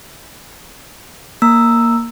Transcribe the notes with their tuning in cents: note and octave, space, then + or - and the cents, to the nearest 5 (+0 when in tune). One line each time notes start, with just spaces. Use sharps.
A#3 +0 A#5 -15 E6 +0